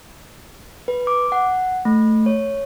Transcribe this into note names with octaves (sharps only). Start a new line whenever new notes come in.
B4
D6
F#5
A3
C#5